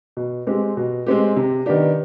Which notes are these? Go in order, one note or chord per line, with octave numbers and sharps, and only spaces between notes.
B2
G#3 C4 G4
B2
G#3 C4 G4
C3
D#3 B3 D4 G4